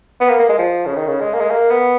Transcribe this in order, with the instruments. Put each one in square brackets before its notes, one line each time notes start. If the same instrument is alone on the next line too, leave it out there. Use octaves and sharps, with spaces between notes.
[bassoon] B3
A#3
A#3
G#3
F3
C#3
D#3
C#3
G#3
A#3
G#3
A#3
B3